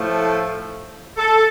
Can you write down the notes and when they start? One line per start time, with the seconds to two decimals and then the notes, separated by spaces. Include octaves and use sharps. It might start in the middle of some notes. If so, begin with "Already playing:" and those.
Already playing: A2 F3 A3
1.17 A4